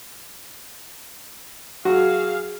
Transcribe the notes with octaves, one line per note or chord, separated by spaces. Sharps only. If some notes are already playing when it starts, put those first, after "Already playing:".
F#3 F#4 G#4 F5